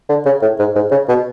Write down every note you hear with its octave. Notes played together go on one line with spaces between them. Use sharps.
D3
C#3
A2
G#2
G#2
C#3
B2